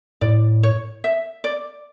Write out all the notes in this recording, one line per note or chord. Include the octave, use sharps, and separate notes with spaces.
A2 D5
C#5
E5
D5